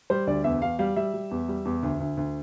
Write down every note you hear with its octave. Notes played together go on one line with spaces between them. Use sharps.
G3 C5
D2 D5
E2 E5
E2 F5
G3 F5
G3 E5
G3
E2
G3
E2
D2
D2
D2